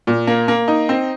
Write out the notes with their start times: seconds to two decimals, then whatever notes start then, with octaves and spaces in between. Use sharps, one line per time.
0.07 A#2
0.27 A#3
0.48 A#3
0.68 D#4
0.89 C4